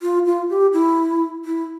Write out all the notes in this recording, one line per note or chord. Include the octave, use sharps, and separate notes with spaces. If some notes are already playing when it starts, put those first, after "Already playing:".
F4
F4
G4
E4
E4